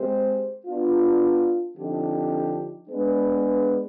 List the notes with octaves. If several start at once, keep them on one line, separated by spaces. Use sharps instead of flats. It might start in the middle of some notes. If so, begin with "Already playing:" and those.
Already playing: G#3 C4 G4 C5
B3 D4 F4
D3 F3 C4 D#4 G4
G#3 B3 D4 G#4 B4